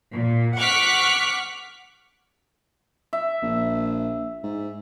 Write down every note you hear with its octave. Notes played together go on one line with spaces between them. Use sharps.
A#2
F#5 C#6 D6 F6 F#6 B6
E5
A#1
G#2